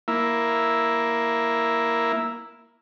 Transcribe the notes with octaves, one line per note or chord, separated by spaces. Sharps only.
A#3 E4